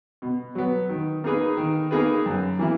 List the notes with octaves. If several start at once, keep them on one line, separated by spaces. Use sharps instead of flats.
B2
F#3 B3
D#3
A#3 D#4 G#4 B4
D#3
A#3 D#4 G#4 B4
F#2
E3 A#3 E4